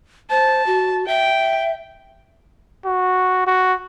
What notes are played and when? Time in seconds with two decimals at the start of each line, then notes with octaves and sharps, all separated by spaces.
0.30 C5 A5
0.66 F#4
1.08 E5 G5
2.86 F#4
3.47 F#4